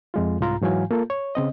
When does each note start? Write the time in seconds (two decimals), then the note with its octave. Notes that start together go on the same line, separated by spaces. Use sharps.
0.14 F2 G#3 F4
0.40 C2 G#2 F4 A#5
0.62 G#2 E3 F#3 F5 G#5
0.91 A#3 F4 A4
1.10 C#5
1.35 C#3 C4 D#5